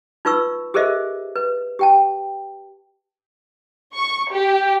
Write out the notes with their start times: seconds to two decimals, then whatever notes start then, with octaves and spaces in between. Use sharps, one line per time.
0.25 D#4 F4 B4 C#6 E6
0.74 G4 G#4 A#4 C5 D#5 E5
1.36 B4
1.79 G4 G5 A5
3.96 C#6
4.33 G4